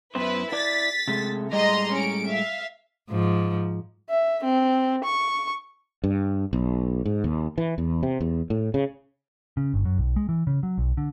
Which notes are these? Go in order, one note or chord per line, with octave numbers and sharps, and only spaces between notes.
F#2 B3 E4 B4 C5
E4 D5 A6 B6
C3 G#3 A3
A2 G3 G#3 D#5 A#5 C6
C#4 D7
E5 F5
G#2 F3
E5
C4
C#6
G2
B1
G#2
D#2
E3
E2
C3
E2
A2
C#3
C#3
G1
F#2
B1
G#3
E3
C#3
F#3
B1
D3